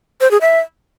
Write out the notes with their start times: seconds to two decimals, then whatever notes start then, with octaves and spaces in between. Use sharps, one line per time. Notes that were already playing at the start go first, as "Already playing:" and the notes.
0.21 C5
0.31 G#4
0.41 E5